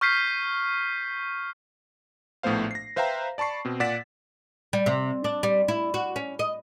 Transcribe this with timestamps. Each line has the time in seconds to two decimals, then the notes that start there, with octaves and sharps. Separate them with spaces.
0.01 C#6 F6 G6 B6 C7 D#7
2.43 A#1 A2 A3 B3 C5 F5
2.71 A#6 C7
2.96 B4 C5 E5 F5 G5 A#5
3.38 D5 A5 B5 C#6 C7
3.65 B2 C4
3.80 A#2 D5 F#5 A6 B6 E7
4.73 G3
4.86 C3
5.24 D4
5.43 G3
5.68 E4
5.94 F#4
6.16 C#4
6.39 D#5